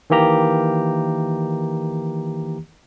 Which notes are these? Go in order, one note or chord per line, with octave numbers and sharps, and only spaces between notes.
D#3 E3 A#3 G4 A#5